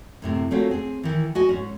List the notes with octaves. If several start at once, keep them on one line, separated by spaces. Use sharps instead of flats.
F#2 A2 C3
A3 C4 C#4 F4 F#4 A#4
C4 G#4
D#3 E3
F#4 D#5 G#5
G#2 C#4